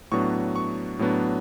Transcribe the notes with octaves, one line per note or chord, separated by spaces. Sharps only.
A2 F#3 B3 D4 C#6
C#6
A2 F#3 B3 D4